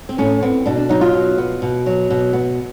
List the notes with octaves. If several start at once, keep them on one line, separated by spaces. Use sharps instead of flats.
C4
A2 C#4
B3 C4
B2 D4
D4
F#3 D#4
F4
B2
B3
B2
F#3
B2
B3